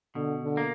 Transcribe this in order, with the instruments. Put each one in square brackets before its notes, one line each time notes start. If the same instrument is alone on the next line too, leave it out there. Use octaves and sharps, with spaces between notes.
[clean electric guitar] B2 [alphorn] D3
[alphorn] D3
[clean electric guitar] A#3